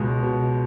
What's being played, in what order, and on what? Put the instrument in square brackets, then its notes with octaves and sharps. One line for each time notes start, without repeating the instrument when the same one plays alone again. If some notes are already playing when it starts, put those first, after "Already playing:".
Already playing: [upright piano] C#2 B2 G#3
B2